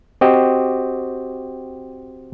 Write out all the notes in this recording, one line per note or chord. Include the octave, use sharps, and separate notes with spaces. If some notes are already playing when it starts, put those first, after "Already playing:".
C4 F#4 G4 D#5